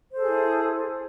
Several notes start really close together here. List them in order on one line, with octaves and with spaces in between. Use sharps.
C5 A4 G#4 E4